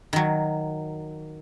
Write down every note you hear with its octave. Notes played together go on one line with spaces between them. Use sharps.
D#3 F#3